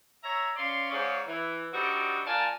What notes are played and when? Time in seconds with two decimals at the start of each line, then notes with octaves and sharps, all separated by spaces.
0.23 C#5 E5 A#5
0.56 C#4 D5 F5 C6
0.90 G#2 C#4 G#4 C#5 D5 F5
1.27 E3
1.73 G3 C4 D4 D#4 F#4
2.26 A#2 F4 A#4 D5 G#5 A5